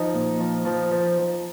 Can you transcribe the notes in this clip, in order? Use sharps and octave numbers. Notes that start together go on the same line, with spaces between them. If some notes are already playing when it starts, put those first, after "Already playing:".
Already playing: F3 D#4
A#2
F3
F3
F3
F3